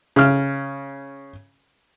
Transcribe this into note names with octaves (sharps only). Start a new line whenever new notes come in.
C#3 F6